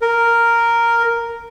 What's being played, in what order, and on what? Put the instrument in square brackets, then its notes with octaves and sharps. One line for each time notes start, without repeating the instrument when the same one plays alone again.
[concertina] A#4